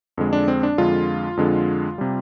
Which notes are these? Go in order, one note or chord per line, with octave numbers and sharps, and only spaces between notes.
F2 D3 G#3
D4
C4
D4
F2 D3 G#3 F4
F2 D3 G#3
C3 G3